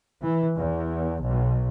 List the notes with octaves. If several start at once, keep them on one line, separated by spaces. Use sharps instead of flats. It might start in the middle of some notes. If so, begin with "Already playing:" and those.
E3
E2
B1